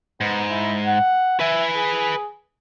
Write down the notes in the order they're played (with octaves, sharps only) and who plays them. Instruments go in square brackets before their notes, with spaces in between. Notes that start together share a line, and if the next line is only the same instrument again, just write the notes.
[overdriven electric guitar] G#2 [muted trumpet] B3
[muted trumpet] E4
F#5
[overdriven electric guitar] B4 G#5 [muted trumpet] E5
[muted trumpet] G#4